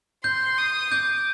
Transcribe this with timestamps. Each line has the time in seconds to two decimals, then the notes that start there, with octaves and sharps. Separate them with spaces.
0.24 C6 G6
0.58 D#6
0.91 D6 G6